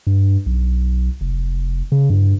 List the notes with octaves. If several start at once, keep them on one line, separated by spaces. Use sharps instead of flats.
G2
B1
F1
C#3
G2